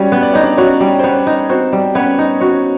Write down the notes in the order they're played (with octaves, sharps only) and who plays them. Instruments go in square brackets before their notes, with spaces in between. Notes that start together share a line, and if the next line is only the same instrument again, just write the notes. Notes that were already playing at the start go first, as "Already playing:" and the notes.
Already playing: [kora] G3 F#4 [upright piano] C#4 C#5
[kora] B3
[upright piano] D5
[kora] D#4 [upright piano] C#5
[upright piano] D4 D5
[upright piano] C#4 C#5 [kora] F#4
[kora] G3
[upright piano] C5
[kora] B3 [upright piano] C#4 C#5
[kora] D#4
[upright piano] C4 C5 [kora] F#4
[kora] G3
[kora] B3 [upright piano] C#4 C#5
[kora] D#4
[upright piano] C#4 C#5 [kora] F#4